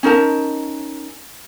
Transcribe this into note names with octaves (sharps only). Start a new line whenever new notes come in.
C#4 D#4 A#4 A5